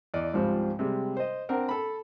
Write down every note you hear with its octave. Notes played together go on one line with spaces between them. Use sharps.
E2 D5 D#5
C#2 G#2 F3 G3 C4
C3 G3 G#3
C5 D#5
C4 D4 A#4 F#5
A4 B5